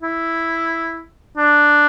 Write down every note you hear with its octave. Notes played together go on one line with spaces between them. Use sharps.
E4
D4